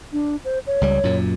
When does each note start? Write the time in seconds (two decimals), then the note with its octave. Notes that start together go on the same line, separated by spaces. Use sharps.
0.13 D4
0.45 C5
0.67 C#5
0.81 C#2 G3
1.03 F#2 A#2